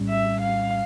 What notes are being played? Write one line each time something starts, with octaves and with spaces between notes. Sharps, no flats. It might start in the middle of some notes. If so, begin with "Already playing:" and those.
Already playing: A#1 A2 G3 C#4
E5
F5